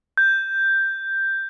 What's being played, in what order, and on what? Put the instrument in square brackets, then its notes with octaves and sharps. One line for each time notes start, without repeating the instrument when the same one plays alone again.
[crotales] G6